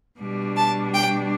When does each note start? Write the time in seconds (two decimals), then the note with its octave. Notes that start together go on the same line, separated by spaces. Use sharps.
0.20 B2 G3 D4
0.57 A5
0.94 G5